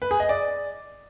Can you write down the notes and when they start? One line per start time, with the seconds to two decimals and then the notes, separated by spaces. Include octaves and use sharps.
0.02 B4
0.11 G#4
0.20 D#5
0.29 D5